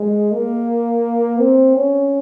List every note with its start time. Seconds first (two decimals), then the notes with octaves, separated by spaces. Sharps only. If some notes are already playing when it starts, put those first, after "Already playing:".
Already playing: G#3
0.32 A#3
1.39 C4
1.76 C#4